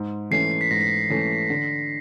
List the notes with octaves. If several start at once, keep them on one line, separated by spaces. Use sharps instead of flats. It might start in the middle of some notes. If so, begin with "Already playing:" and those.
Already playing: G#2
E3 A3 C#4 C7
C7
B6
G#2 A#6
B6
E3 A3 C#4
D3